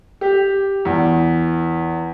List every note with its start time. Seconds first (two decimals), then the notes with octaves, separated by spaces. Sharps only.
0.21 G4
0.85 E2